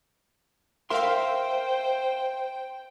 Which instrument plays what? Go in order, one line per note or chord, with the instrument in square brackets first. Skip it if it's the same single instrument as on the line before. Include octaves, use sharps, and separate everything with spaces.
[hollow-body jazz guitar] A#4 C6 [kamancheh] C5 [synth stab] E5 F5 [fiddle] G5